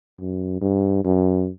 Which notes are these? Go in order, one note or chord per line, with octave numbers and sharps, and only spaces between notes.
F#2
G2
F#2